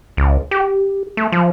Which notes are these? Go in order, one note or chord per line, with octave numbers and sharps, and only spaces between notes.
C#2
G4
A3
F3